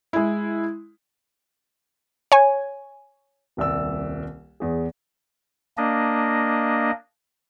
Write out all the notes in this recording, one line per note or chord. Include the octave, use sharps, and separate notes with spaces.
G#3 E4
C#5 G#5
D#1 C2 D5 E6
E2 G#4
A#3 D4 D#5